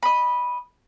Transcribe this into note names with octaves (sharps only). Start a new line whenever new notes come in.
D#5 B5